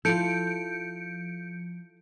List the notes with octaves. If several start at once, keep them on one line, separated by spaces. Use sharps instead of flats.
F3 E4 F4 A4 G6 C#7 D7